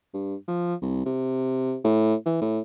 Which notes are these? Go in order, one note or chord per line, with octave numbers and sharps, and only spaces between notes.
G2
F3
C2
C3
A2
E3
A2